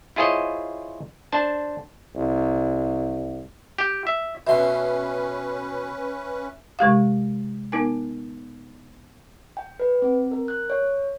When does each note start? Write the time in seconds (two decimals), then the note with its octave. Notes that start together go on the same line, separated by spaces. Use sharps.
0.16 E4 F4 G#4 C5 C#5 D#5
1.32 D4 C5 A5
2.15 C2
3.78 G4
4.07 E5
4.47 B2 C#4 B4 E5 C6
6.79 C3 G#3 G4 F5
7.72 B3 D#4 A#4 G#5
9.57 G5
9.80 B4
10.02 C4
10.31 A#4
10.48 F#6
10.70 C#5